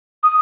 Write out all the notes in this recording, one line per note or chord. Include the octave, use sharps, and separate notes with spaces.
D#6